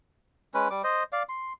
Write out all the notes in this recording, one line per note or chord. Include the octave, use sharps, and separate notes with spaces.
G#3 C#4 B4
G3 D6
C5 D#5
D5 F5
C6